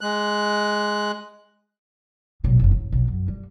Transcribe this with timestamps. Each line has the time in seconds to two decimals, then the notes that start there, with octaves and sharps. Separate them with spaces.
0.01 G#3 F#6
2.44 B1 A#2
2.59 F#1 F2
2.71 A1
2.92 B1
3.08 F#2
3.28 G3